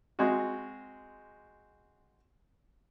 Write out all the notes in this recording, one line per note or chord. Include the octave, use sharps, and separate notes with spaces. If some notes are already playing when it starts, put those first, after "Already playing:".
G#3 C4 F#4